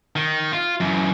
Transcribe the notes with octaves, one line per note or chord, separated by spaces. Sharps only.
D#3
F4
F#2 E3